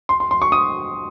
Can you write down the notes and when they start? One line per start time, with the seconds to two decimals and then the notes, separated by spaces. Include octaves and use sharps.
0.09 C6
0.20 C6
0.31 C6
0.42 C#6
0.52 D#6